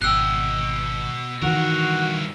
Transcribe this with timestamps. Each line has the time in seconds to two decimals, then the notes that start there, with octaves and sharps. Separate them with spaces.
0.02 G#1 B2 G5 E6 F#6
1.42 G2 D#3 E3 F#4 A#4